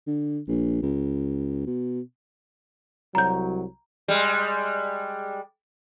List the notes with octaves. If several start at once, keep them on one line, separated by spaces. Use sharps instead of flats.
D3
A#1
C#2
B2
C2 F#3 A#5 G6
G3 G#3